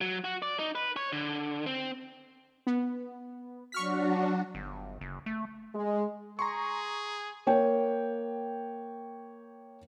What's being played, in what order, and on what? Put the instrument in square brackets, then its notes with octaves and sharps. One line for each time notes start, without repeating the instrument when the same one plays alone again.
[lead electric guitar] F#3
F#4
D5
D#4
B4
C#5
D3
C4
[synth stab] B3
[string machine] F#3 D4 F#4 [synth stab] C#6 F6 B6
[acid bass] G1
F#1
A3
[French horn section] G#3
[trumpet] G#4 [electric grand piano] A#5 C6 C#6
[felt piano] A#3 C#5 G5